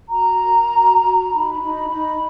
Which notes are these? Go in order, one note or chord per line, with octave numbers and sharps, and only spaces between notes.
F#4 A#5
A#4
F#4
F#4
D#4 B5
D#4
D#4